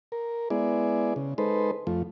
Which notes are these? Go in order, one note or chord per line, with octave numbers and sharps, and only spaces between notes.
A#4
G#3 B3 E4 G#4 D5
C#3
G#3 D#4 A4 B4 C5
F2 F3 A3